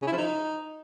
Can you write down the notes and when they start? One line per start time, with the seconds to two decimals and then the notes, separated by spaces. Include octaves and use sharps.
0.02 C#3
0.07 E4
0.12 F3
0.17 D#4